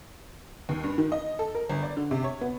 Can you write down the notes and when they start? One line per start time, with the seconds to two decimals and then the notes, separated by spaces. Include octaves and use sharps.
0.69 D#2
0.83 G2
0.98 D#3
1.12 D#5
1.39 A4
1.55 A#4
1.69 G1
1.83 D5
1.97 D3
2.11 C3
2.24 C#5
2.41 B3